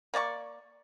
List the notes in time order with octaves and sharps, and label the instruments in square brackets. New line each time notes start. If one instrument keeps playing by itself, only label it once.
[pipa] A#3 D5 E5 C#6